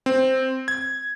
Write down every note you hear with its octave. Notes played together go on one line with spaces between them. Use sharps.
C4
G#6